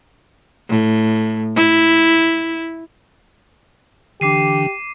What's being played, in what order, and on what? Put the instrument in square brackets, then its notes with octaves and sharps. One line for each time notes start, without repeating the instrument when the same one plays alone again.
[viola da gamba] A2
E4
[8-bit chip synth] D3 E3 D4 [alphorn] G4 [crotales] D6 C7 D#7